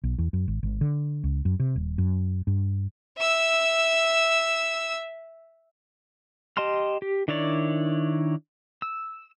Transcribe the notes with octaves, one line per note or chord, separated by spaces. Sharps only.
B1
E2
F#2
G#1
G#1
D3
C#2
F#2
C3
D#1
F#2
G2
E5 E6
G4 D#5 A5 C6 F6
G4
D#3 D4 E4 C#5 D5
E6